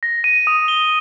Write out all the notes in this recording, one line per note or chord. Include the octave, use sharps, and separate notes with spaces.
A#6
D#7
D#6
G7